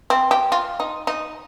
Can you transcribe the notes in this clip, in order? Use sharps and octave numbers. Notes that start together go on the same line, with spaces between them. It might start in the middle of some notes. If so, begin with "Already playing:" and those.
C4
G4
F4
D#4
D#4